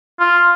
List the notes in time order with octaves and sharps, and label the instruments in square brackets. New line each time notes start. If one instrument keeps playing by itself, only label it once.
[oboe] F4